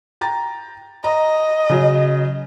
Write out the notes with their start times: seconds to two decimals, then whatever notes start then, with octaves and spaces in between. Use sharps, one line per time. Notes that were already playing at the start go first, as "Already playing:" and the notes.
0.21 G5 A#5 A6
1.04 D#5 A#5
1.70 C#3 F#3